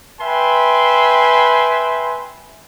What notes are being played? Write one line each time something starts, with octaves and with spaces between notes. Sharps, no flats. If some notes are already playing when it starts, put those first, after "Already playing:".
B4 E5 G5 G#5 C6